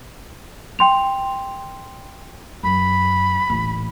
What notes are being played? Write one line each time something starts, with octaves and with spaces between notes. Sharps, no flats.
G5 C6 F7
F#2 B5
D#1 A1